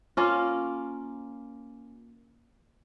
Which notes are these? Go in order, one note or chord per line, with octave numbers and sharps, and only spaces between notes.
A#3 C#4 F4